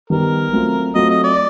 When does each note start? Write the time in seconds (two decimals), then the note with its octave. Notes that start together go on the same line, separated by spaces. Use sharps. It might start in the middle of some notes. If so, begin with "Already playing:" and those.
0.10 D#3 G3 B3 D#4 G4 A#4
0.53 F#3 A3 C4 F4
0.95 F#3 A3 C4 F4 D#5
1.10 D#5
1.24 D5